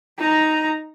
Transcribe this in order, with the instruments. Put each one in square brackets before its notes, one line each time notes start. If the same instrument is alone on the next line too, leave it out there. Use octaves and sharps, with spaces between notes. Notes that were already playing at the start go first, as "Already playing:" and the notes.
[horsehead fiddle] D#4 A#5